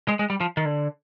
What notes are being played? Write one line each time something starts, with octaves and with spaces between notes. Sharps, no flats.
G#3
G#3
G3
F3
D#3
D3